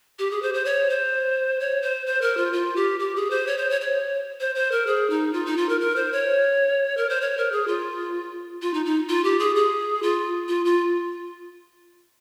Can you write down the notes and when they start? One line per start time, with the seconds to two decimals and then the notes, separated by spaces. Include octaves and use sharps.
0.19 G4
0.31 G#4
0.42 C5
0.54 C5
0.65 C#5
0.90 C5
1.60 C#5
1.82 C5
2.06 C5
2.21 A#4
2.37 F4
2.53 F4
2.76 G4
3.00 G4
3.16 G#4
3.30 C5
3.47 C#5
3.58 C5
3.70 C#5
3.81 C#5
4.40 C5
4.55 C5
4.72 A#4
4.87 G#4
5.10 D#4
5.33 F4
5.46 D#4
5.57 F4
5.69 A#4
5.81 A#4
5.96 C5
6.12 C#5
6.97 A#4
7.09 C5
7.21 C#5
7.37 A#4
7.52 G#4
7.67 F4
8.62 F4
8.74 D#4
8.86 D#4
9.09 F4
9.24 G4
9.39 G#4
9.56 G#4
10.03 F4
10.48 F4
10.65 F4